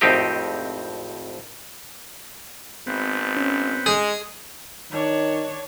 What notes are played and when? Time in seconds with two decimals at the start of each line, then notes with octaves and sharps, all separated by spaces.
0.01 G#1 F2 A2 C4 D#4 G4
2.87 G#1 B3 C4
3.37 C#4
3.86 G#3 G#4
4.92 D#3 D4 C#5